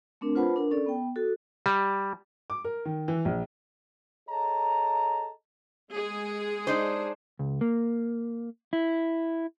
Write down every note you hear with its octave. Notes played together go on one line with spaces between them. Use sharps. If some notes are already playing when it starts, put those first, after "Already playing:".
A3 C4 D4 A#4
F4 B4 C5 F#5 A5 B5
D4 A#4
C#4 A4 D5
B3 G5
F#4 A4
G3
D6
A#4
D#3
E3
A#1
G#4 A4 C#5 D#5 A5 A#5
G#3 G#4
D4 D#4 C5
C#2
A#3
E4